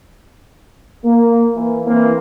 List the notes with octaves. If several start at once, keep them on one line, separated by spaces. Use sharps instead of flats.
A#3
E3
E3 A#3 C4 E4